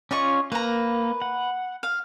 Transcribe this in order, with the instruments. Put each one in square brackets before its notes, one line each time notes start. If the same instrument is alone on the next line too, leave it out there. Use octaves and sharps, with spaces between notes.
[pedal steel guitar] C#4 F4 [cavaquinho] D5 D#5 C#6
[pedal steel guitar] A#3 [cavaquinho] B4 A#5
[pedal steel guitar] F#5
[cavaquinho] F5